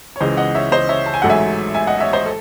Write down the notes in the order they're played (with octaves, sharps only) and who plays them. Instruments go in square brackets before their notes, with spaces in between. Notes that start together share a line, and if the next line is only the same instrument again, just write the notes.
[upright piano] C#5
C#2 C#3 E3 C5 D#5
D#5 F#5
C#5 E5
C5 D#5
C#5 E5
A5
G#5
A1 G#2 F#3 A3 F#5
E5 G#5
E5 G#5
D#5 F#5
C#5 E5
C5 D#5
A4